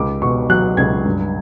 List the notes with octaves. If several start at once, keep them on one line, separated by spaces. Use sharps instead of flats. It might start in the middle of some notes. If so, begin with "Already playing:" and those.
Already playing: C#2 D6
B2 C#6
F#3 F#6
C#2 G#6
G2